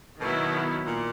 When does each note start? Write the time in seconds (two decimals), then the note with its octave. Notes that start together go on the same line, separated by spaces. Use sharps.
0.20 B2 D#3 F#3 B3 E4
0.86 A#2